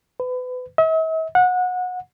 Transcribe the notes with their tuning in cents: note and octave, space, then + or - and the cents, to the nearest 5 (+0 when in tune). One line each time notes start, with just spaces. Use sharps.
B4 +30
E5 -45
F#5 -25